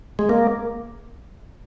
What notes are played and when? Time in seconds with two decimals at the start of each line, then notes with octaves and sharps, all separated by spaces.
0.19 G#3
0.29 A#3